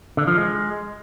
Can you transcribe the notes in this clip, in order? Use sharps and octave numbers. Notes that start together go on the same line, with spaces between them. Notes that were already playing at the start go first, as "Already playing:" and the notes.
D3
F3
G#3